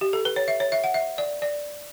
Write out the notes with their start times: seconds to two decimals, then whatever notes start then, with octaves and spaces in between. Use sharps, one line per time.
0.01 G4
0.13 A4
0.25 B4
0.36 C#5
0.48 E5
0.60 C#5
0.72 E5
0.84 F#5
0.94 E5
1.18 D5
1.42 D5